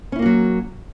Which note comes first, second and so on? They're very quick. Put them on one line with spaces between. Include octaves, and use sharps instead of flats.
C#4 E4 A#3 F#4 F#3